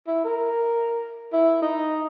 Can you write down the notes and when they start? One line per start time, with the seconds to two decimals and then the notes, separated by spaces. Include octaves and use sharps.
0.07 E4
0.24 A#4
1.33 E4
1.62 D#4